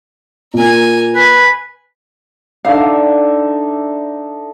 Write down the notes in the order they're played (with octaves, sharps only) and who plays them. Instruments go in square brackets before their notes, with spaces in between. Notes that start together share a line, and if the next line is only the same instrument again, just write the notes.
[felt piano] A#2 [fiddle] A#4 G#5
[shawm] B4 [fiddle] G#5
[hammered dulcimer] D3 D#4 E5 [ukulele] F5